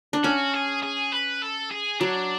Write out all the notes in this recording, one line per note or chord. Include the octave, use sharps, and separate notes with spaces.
D4
C#4 F#4
G#4
G#4
B4
A4
G#4
F#3 D4